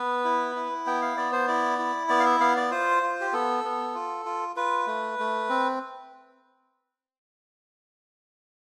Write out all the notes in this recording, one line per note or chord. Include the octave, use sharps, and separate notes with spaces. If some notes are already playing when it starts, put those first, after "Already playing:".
Already playing: B3 B4
E4
E4
B3 G5
F5
B3 D5
C5
E4 D5
E4
B3 D5
F5
E5
B3 F5
D5
F4 C5
F4
G4
B3 A4
B3
F4
F4
F4 B4
A3
A3
C4